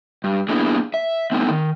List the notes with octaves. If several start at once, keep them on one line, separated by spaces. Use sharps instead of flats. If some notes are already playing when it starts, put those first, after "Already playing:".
G2
A#3 B3 D4 E4 G#4
E5
A3 B3 C4 D#4
D#3